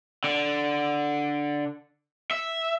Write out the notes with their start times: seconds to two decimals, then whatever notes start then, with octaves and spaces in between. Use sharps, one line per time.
0.24 D3
2.31 E5